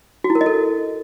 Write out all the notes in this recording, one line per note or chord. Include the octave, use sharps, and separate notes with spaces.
F#4
E4
A#4
D#5
A4